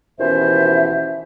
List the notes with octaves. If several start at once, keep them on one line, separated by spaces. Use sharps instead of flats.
D#2 B2 E3 C#4 C5 E5